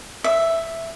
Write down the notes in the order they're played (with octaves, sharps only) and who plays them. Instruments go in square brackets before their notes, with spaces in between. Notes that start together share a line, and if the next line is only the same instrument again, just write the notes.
[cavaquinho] E5